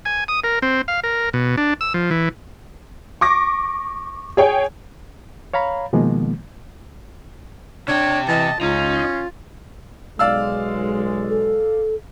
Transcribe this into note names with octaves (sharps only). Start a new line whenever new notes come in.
G#5
D#6
A#4
C4
F5
A#4
B2
D4
E6
F3
E3
C#6 D6 A#6
G#4 C#5 G5 G#5
C#5 F5 A#5 B5
B2 D#3 F3 G#3 A#3 B3
C3 D4 C#5 G5
E3 D#5 A5
C#2 C#4 D#4 F4
B1 G#3 D5 F5 E6
A4